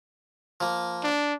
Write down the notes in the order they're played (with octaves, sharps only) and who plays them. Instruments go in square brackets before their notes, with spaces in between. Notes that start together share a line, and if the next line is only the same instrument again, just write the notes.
[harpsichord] F3 A#3
[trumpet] D4